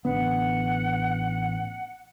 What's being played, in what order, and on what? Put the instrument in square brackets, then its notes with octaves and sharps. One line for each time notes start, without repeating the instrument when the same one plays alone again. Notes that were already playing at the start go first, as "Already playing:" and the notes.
[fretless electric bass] A1 D3 B3 [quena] F#5